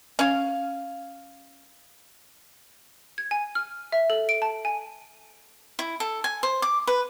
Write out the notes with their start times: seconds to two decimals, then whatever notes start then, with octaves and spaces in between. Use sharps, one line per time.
0.19 C#4 F5
3.18 G#6
3.31 G#5
3.55 F6
3.92 E5
4.10 A4
4.29 D7
4.42 A5
4.65 G#5
5.79 E4
6.00 A4
6.24 G#5
6.43 C5
6.62 D6
6.87 B4